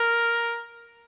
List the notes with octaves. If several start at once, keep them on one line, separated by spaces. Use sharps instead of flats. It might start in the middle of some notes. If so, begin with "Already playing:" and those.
Already playing: A#4